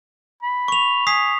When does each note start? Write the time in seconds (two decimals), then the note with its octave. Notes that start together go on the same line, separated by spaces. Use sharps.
0.42 B5
0.68 C#6 F7
1.07 G#5 D#6 B6 C7